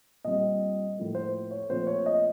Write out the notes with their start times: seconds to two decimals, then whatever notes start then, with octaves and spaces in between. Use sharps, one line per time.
0.24 A#2 G3 C4 D#5
0.97 A2 F3 A#3
1.15 C5
1.51 C#5
1.69 A#2 F3 A3 C4 C5
1.87 C#5
2.06 D#5